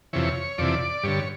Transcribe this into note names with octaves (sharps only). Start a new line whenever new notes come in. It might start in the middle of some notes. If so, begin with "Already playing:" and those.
F2 C3 E3 C#5
F2 C3 E3 D5
G2 D3 C#5